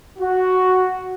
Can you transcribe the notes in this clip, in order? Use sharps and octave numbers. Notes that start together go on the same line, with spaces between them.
F#4